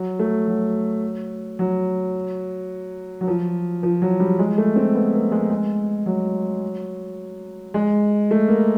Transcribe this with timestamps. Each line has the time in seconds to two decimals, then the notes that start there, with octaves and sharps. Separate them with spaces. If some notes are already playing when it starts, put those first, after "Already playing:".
Already playing: F#3
0.19 A3
0.47 F#3
1.59 F#3
3.21 F#3
3.27 F3
3.83 F3
4.02 F#3
4.20 G3
4.39 G#3
4.58 A3
4.76 C4
4.95 B3
5.14 A#3
5.32 G#3
5.50 G#3
6.06 F#3
7.74 G#3
8.31 A3
8.48 A#3